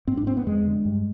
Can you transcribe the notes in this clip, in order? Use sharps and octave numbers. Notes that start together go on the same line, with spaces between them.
G#2 C4
D4
C4
B3
F2 G#3
D3
G2